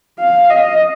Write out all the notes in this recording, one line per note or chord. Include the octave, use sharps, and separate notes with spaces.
F5
D#5